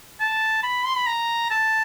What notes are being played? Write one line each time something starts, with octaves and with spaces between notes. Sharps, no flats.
A5
B5
C6
B5
A#5
A5